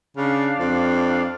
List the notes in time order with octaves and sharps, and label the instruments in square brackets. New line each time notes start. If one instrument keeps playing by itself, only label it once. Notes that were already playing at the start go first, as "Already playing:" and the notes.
[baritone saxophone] C#3 [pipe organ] D4 F5
[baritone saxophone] F2